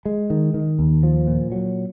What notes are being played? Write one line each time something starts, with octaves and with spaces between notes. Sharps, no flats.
G#3
D#3
D#3
D#2
F3
A#2
F#3